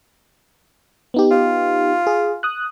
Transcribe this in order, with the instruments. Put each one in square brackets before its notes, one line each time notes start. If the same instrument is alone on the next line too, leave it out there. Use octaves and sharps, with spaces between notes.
[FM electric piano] B3 D#4 G4
[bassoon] F4
[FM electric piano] G#4
D#6 F#6